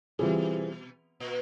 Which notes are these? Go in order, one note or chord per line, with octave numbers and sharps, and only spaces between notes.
B2 E3 G3 C4 F4 G#4
A#2